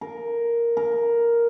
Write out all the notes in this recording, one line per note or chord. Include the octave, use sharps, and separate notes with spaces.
A#4
A#4